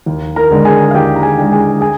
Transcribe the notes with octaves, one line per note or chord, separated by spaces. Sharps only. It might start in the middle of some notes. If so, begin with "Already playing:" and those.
D#2
A#4 A#5
D3 G#3
G#4 G#5
F5
D#2 G4 G5
A#5
G#4 G#5
D3 G#3
G#4 G#5
G#4 G#5